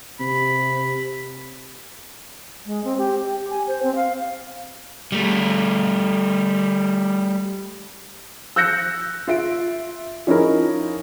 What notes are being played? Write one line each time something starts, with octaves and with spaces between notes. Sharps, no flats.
C3 B5
G#3
C4
G4
G4
G#5
C5
C4
F5
G3 A3
E6 F#6 G6 A#6 C#7
F4 E5 D7
F3 C#4 D#4 E4 A#4